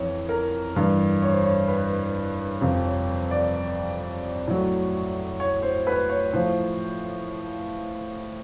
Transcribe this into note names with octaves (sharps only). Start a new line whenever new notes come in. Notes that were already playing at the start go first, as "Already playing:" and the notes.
Already playing: F2 E3 C#5
A#4
G2 E3
C#5
C5
C#5
B4
F2 C3 F3 C5
C#5
D5
A2 F#3
C#5
C5
B4
C#5
A2 F3 C5